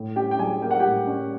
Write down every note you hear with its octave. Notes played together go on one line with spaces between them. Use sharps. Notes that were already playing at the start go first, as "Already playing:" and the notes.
Already playing: A2
C#4 G4 G5
G5
F#3 G#4 G#5
A#3 G5
F#5
A2 G4 G5
C#4